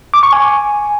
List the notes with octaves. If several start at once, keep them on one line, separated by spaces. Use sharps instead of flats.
D6
C#6
G#5